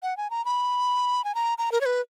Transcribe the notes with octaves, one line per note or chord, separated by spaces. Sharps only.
F#5
G#5
A#5
B5
G#5
A#5
A#5
A#4
C#5
B4